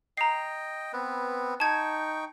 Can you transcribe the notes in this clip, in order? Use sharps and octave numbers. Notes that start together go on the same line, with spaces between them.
D#5 G5 A#5 C7
B3 C4 B4
D#4 G5 A5 C#6 G#6